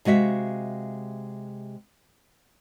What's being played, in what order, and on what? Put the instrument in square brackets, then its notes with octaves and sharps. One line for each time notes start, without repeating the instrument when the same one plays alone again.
[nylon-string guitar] C3 G#3 F#4 E5 F5